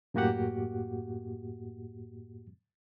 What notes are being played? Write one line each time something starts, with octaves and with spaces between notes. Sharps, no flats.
F#2 A2 A#3 F#4 G4 F#5